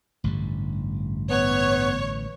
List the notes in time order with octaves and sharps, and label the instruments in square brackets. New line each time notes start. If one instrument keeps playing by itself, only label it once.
[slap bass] A1 D3 G3 [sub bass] G2
[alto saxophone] B3 [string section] C#5